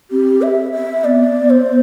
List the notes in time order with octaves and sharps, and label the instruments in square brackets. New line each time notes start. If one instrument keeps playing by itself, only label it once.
[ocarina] C4 [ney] G4
[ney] E5
E5
[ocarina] B3 [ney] D5
[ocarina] B3
[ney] C5
[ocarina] B3